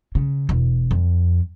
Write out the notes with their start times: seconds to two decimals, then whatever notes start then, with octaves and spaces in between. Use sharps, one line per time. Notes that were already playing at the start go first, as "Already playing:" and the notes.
0.15 C#3
0.49 E1
0.91 F2